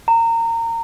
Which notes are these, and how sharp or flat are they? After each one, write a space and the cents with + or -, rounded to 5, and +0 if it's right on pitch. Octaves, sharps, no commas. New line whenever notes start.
A#5 -25